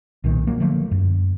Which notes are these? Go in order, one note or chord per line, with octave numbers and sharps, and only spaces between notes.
B1 A#2 D#3
F#3 A#3
D3 F3 A3 A#3
F#2